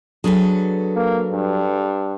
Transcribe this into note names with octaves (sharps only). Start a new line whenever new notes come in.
F#3 D4 G#4 A4 B4
A#3
G2